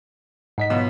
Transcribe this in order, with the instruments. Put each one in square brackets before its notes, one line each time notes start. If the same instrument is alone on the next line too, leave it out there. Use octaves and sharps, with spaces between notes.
[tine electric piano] G#2 D#5 B6
[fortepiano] B2 F#3 F4